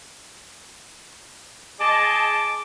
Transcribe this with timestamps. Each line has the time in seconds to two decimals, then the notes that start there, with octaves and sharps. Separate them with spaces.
1.80 G#4 D#5 A5 D6